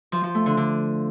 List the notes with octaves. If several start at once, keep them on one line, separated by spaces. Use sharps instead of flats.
F3
F3
A3
D3
D3